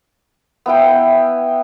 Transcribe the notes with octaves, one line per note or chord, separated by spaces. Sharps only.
B3 E4 G5